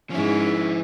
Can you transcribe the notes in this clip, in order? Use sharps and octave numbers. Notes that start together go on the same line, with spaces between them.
G#2 F3 C#4 E4